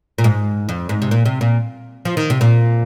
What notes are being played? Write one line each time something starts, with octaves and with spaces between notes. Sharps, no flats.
A#2
G#2
F2
G#2
C3
A#2
C3
A#2
F3
D#3
C3
A#2